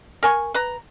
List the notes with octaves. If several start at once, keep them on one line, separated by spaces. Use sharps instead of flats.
A#4 G#5 C#6
B4 A#5